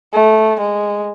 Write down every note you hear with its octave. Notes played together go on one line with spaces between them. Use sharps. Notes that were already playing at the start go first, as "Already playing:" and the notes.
A3
G#3